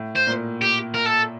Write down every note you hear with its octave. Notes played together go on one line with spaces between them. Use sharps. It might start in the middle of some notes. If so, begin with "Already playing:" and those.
Already playing: A2
C5
A#2
G4
A#4
A4